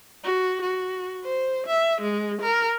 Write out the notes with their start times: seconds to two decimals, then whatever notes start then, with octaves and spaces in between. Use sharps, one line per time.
0.24 F#4
0.62 F#4
1.24 C5
1.67 E5
2.01 G#3
2.42 A#4